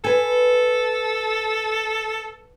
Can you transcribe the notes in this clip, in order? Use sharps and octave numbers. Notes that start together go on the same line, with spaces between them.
A4 B4 G#5